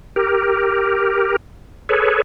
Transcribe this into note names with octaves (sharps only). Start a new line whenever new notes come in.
G4 A#4
G#4 A4 B4 C#5